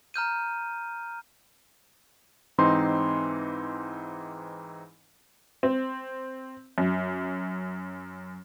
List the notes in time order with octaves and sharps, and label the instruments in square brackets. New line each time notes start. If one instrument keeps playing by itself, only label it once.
[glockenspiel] A#5 F6 G6 D#7
[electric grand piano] G#2 E3 C4 D#4 C6
[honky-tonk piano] C4
F#2